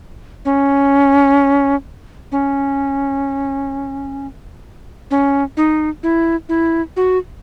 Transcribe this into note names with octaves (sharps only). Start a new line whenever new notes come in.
C#4
C#4
C#4
D#4
E4
E4
F#4